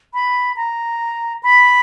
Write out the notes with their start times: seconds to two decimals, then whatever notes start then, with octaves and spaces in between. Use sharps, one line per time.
0.14 B5
0.56 A#5
1.43 B5